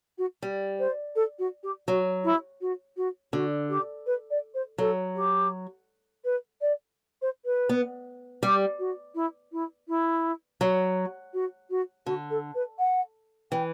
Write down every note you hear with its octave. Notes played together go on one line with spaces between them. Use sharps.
F#4
G3
C5
A4
F#4
G4
F#3 F#4
E4
F#4
F#4
D3 F#4
G4
B4
D5
C5
F#3 A4
G4
B4
D5
C5
B4
B3
G3 G4
F#4
E4
E4
E4
F#3
F#4
F#4
D3 F#4
A4
B4
F#5
E3 G5